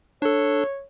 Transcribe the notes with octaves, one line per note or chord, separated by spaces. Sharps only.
D4 A4 C#5